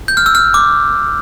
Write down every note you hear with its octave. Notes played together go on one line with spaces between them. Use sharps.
G6
F6
E6
F6
D6